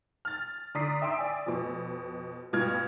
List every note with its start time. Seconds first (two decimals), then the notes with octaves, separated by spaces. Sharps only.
0.25 F6 A6
0.75 D3 D5 A#5 D#6 B6 C7
1.02 E5 G5 C6 E6 D7
1.18 D5 G#5
1.46 F2 B2
2.53 G2 B2 F4 F6 G#6